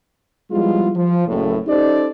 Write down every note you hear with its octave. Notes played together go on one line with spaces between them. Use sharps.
F3 G3 G#3 B3 E4 F4
F3
F#1 A2
C#4 D#4 G4 A4 C5 D5